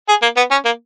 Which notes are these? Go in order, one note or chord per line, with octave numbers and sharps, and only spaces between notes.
G#4
A#3
B3
C#4
A#3